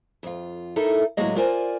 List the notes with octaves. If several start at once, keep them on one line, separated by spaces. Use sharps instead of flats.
F2 F4
D#4 E4 A4 A#4
A2 D3 F#3 G#3 A#3 D#5
F4 A#4 C5 D5 G#5